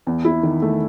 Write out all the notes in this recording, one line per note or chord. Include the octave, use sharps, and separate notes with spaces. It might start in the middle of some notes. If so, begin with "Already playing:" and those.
E2
E4
D#3
A3